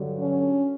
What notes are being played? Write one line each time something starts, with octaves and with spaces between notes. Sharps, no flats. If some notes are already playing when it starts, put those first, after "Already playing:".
Already playing: G2 D3 F#3
C#4